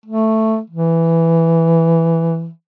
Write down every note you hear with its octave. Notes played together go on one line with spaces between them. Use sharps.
A3
E3